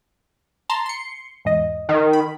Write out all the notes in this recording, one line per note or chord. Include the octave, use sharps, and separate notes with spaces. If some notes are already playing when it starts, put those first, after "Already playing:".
A5 A#5 C6
C6 C#7
E2 G#2 D#5
D#3
B5